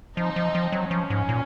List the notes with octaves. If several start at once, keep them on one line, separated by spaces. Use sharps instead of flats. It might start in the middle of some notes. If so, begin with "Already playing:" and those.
F3 C4 D#4
F3
F3
F#3
F3 C#4
G#2
A#2